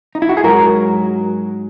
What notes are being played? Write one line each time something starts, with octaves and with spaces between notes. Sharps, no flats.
D#4
E4
F#4
G#4
G#2 F#3 F#4 A#4